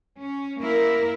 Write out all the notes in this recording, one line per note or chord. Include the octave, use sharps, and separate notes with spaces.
C#4
A#3 E4 A#4